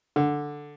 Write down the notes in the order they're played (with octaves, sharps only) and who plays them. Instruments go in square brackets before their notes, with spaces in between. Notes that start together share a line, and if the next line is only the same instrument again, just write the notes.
[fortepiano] D3